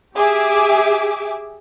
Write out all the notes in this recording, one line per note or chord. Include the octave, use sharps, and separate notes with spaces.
G4 G#4 E5 D6